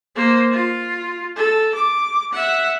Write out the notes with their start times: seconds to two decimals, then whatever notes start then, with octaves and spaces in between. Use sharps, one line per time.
0.16 A#3 C5
0.52 F4
1.36 A4
1.75 D6
2.33 E5 F#5